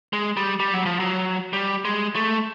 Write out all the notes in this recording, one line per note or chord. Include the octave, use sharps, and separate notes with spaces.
G#3
G3
G3
F#3
F3
F#3
G3
G#3
A3